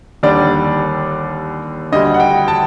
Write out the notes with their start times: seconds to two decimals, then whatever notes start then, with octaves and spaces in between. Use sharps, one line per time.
0.23 D#2 D3 G3 D5
1.92 D2 D3 G3 D#5
2.14 F#5
2.20 G5
2.48 A5